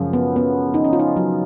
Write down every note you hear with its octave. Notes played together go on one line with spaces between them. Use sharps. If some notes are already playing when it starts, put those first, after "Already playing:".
Already playing: F#2 C#3 F3 G#3
B3
B3
D#4
C#4
F4
D#4
F#3